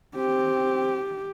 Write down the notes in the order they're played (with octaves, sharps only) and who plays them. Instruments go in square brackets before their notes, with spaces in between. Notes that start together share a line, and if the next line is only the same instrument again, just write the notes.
[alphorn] C4 [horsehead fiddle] G4